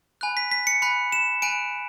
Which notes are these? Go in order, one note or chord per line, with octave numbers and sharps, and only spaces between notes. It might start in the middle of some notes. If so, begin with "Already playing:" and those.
G#5 B5 F#6
B6
B6
C#7
G#5 B5 F#6 C#7
E7
G#5 B5 F#6 D7